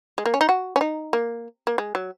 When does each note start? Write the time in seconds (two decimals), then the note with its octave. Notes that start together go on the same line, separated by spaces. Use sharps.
0.18 G#3
0.26 A#3
0.34 C#4
0.41 D#4
0.49 F#4
0.76 C#4
0.81 D#4
1.13 A#3
1.67 A#3
1.78 G#3
1.95 F#3